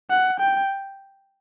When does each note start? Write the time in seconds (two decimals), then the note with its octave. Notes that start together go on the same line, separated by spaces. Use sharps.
0.10 F#5
0.40 G5